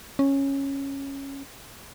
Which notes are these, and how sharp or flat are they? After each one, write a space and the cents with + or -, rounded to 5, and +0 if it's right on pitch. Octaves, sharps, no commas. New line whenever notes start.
C#4 -10